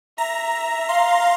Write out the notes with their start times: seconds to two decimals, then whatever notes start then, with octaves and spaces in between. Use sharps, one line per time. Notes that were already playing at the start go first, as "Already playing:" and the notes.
0.18 E5 A#5
0.88 F5 C6